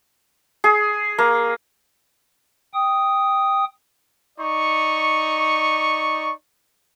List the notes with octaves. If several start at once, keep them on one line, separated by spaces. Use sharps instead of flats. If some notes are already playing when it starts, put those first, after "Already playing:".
G#4
A#3
G5 D#6
D#4 D5 C#6